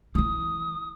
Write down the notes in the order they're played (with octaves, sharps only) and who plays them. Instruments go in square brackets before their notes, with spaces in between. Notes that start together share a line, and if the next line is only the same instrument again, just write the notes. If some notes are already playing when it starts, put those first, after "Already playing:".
[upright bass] E3 E4 [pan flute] D#6